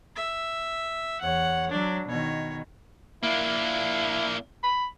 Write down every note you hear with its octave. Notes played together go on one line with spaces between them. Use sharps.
E5
E2 C#5 F#5
F#3 D4
B2 D#3 C#5
A#3 D4 E4
B5